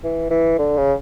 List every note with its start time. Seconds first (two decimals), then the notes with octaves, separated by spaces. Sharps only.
0.04 E3
0.30 E3
0.59 D3
0.77 C#3